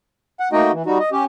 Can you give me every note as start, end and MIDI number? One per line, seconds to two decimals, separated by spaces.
0.40 0.49 78
0.53 0.71 57
0.53 0.71 58
0.53 0.71 63
0.53 0.71 66
0.53 0.71 75
0.53 0.71 79
0.72 0.83 52
0.86 0.98 55
0.86 0.98 63
0.86 0.98 66
1.00 1.09 75
1.12 1.25 61
1.12 1.25 67